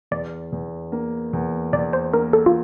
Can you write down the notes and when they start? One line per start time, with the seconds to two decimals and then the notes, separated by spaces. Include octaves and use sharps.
0.11 E2 D5
0.52 E2
0.92 A#3
1.33 E2
1.73 E2 D5
1.93 C5
2.13 A#3 A#4
2.33 A4
2.46 F4